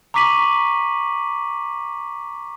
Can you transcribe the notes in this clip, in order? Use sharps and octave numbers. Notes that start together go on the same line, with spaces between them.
A#5 C#6 D6 B6 D#7 F#7